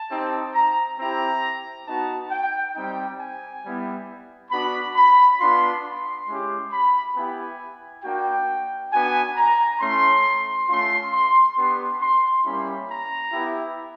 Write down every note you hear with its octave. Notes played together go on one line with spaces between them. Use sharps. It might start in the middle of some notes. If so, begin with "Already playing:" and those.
Already playing: A5
C4 D#4 G4
A#5
C4 E4 G4 A#5
B3 D#4 F#4 A5
G5
G3 C4 D#4 G5
G#5
G3 B3 E4
B3 D4 F#4 B5
B5
B3 D4 F4 C6
C6
G#3 C#4 E4 G4
B5
B3 E4 G4 G#5
A#3 D4 F#4 G5
B3 D4 F#4 G#5
A#5
A3 C#4 E4 C6
A3 C#4 F4 C6
C6
B3 D4 G4 C6
C6
G3 A#3 C#4 E4 G4 B5
A#5
B3 E4 G4